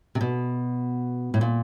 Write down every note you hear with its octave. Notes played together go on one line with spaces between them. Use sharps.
C3
B2
A2
A#2